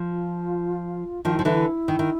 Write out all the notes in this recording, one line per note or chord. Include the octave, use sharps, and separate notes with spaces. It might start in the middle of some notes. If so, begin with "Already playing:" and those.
Already playing: F3
F4
D#3 F3 F4
E4
F3
D3 E3 D#4
E4
D#3
D#3